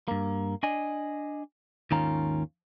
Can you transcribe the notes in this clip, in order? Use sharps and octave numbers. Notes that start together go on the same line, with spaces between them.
G2 A#3
D4 D#5 G#5
D#2 G#2 D#3 C#4 F4 A#5